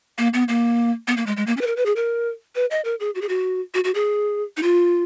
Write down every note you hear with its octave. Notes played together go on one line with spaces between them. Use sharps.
A#3
B3
A#3
B3
A#3
G#3
G#3
A#3
C#4
B4
A#4
B4
G#4
A#4
B4
D#5
A#4
G#4
F#4
G#4
F#4
F#4
F#4
G#4
D#4
F4